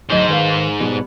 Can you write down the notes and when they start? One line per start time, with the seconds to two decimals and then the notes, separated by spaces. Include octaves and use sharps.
0.10 D2 G#2 F#3 C5 D#5
0.28 D#3 B4 F5
0.80 B2 G3 B3